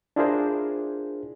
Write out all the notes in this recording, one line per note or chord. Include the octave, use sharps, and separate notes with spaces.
D4 E4 F4 G#4 A#4 C5